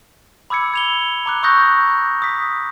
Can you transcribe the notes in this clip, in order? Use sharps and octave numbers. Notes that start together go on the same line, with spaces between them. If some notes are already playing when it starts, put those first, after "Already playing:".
B5 D6 E6 G#6 C#7
G#6 F7 G7
A#5 D6 F#6
C#6 D#6 E6 F#6 G6 A#6
D#6 B6